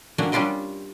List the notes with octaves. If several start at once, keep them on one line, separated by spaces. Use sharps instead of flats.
D#3 F#3 A#3 C#4 D4
G3 C#4 D4 F4 G4 D#5